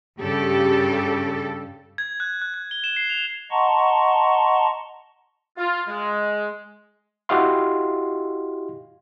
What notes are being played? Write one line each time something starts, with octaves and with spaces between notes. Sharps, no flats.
G2 C#3 G4 A4
G#6
F#6
F#6
F#6
G7
E7
C7
F7
D#5 F#5 A5 A#5 C6 C#6
F4
G#3
E4 F#4 G4 D#5 F5 C6